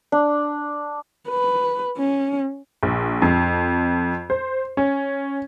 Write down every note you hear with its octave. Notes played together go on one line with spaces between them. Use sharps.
D4
B4
C#4
A#1
F2
C5
C#4